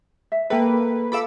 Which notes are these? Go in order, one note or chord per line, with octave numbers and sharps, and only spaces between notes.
E5
A#3 A4 B4 G5
F4 A4 F5 B5 D6 E6